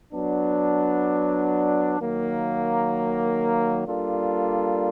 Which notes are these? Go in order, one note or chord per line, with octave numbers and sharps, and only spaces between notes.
F#3 B3 D4
D#3 F#3 A#3
G3 A#3 D4 F4 A4